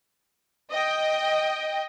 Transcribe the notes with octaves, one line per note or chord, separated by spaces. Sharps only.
D#5 G5